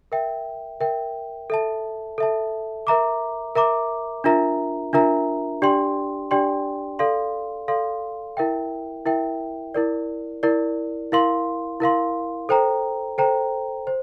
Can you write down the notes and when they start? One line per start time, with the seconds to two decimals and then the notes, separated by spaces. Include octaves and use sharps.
0.12 A#4 E5 G5
0.81 A#4 E5 G5
1.50 A4 E5 A5
2.18 A4 E5 A5
2.87 A#4 E5 A#5 D6
3.55 A#4 E5 A#5 D6
4.24 D4 F4 A#4 E5 A#5
4.93 D4 F4 A#4 E5 A#5
5.62 D4 G4 D5 G5 C6
6.31 D4 G4 D5 G5 C6
6.99 A4 D5 F5 C6
7.68 A4 D5 F5 C6
8.37 E4 A#4 E5 G5
9.06 E4 A#4 E5 G5
9.75 E4 A#4 D5
10.43 E4 A#4 D5
11.12 E4 A#4 F5 C6
11.80 E4 A#4 F5 C6
12.49 A4 C5 G5 A#5
13.18 A4 C5 G5 A#5
13.87 C5